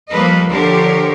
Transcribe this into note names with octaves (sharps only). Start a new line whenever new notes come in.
F3 G3 A#3 A4 B4 D#5
D3 F3 G4 A#4 C#5